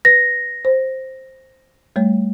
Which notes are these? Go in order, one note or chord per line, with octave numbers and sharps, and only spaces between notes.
B4 A#6
C5
G3 A3 C#5